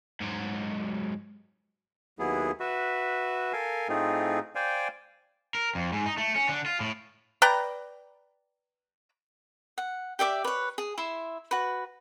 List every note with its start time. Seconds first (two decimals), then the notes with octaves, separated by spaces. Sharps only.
0.20 G#2 F#3
2.19 D#2 F#3 B3 E4 G#4
2.60 F#4 B4 E5
3.53 A4 A#4 F5 G#5
3.89 A2 A3 C4 D#4 F4 G#4
4.55 C5 D5 F5 G5 G#5
5.55 A#4
5.75 F2
5.93 G#2
6.06 D#4
6.17 A3
6.35 C#4
6.49 D3
6.66 F4
6.80 A2
7.42 B4 D5 G5 A#5
9.78 F#5
10.19 G4 D5 E5 D6
10.44 B4 C#5
10.78 G#4
10.98 E4 E5 C6
11.51 F#4 B4